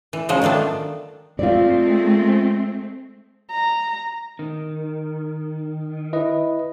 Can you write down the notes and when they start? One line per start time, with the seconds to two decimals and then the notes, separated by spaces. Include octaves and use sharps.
0.13 E3
0.29 C#3 F3 F#3 G#3
0.42 D#3 F3 A3 B3 D4
1.39 G#3 A3 C4 F4 D5
3.51 A#5
4.39 D#3
6.13 E4 B4 D#5